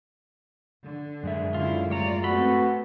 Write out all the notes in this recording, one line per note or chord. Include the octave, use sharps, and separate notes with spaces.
D3
F#2 G#3 E5
D3 C#4 E4 F4
A2 G3 F4 C#5 D5 A#5
A3 B3 C4 F#4 A4 B5